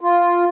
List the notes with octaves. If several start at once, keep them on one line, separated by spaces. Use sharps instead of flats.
F4